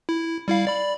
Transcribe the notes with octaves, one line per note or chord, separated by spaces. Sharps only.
E4
G3 E4 F5
D5 B5